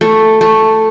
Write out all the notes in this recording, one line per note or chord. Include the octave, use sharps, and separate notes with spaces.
A3
A3